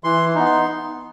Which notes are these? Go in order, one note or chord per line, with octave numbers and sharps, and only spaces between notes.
E3 C6
B3 D#4
C6